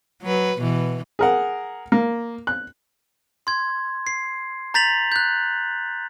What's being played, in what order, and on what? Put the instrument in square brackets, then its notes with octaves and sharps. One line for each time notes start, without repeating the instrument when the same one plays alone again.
[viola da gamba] F#3 B4
B2 E3
[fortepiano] G#4 A#4 F#5
A#3
F#6
[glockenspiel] C6 G#6
C7
A#5 G6 A6 B6 F7 F#7
F#6 G6